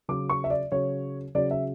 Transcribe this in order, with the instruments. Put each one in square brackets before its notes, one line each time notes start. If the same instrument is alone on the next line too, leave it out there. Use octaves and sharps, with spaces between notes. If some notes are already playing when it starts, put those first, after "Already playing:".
[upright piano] C#3 F#3 D6
C#6
E5
D5
C#3 F#3 C#5
C#3 F#3 D5
E5